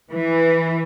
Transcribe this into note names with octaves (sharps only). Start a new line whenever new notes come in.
E3